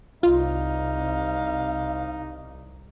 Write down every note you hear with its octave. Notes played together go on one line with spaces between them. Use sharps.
C2 D#4 F4 F5